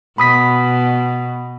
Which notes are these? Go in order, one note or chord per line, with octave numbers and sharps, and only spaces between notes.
B2 B5 D#6 B6